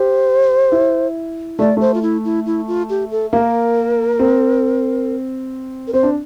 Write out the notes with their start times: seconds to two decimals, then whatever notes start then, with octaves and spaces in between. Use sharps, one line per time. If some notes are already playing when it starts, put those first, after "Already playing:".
Already playing: G4 C5
0.72 E4
1.59 A3 D5
1.77 A3 C5
1.94 F4
2.02 E4
2.25 E4
2.46 E4
2.67 F4
2.89 G4
3.11 A4
3.33 A#3 A#4
4.19 C4
5.88 A#4
5.93 C4 C5
6.03 D4